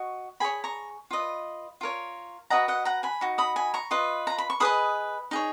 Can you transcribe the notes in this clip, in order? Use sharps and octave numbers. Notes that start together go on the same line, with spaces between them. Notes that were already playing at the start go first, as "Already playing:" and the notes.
Already playing: F#4 D#5 C#6
G#4 C#5 G#5 B5
A#5 C#6
F4 B4 D#5
F4 A#4 C#5
F#4 B4 D#5 F#5 A#5
D#5 F#5
F#5 A#5
G#5 B5
D#4 F#4
B5 D#6
G#5 B5
A#5 C#6
F4 B4 D#5
A#5
B5
C#6
G#4 B4 D#5 B5 D#6
D#4 G#4 C#5